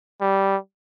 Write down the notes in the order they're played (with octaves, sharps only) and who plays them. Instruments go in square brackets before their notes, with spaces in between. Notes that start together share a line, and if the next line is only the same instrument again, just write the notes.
[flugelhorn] G3